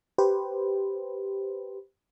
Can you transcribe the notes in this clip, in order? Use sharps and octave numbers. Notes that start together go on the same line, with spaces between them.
G4 B4 C5